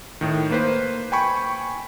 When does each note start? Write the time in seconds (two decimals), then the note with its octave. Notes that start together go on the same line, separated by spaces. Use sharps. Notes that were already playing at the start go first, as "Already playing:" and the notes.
0.21 A2 D#3
0.51 A#3 B4 C5
1.12 G5 G#5 B5 C#6